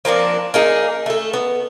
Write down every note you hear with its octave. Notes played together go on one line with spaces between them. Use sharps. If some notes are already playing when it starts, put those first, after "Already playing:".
F3 A#3 C4 D4
A#3 D#4 G#4
A3 A4
B3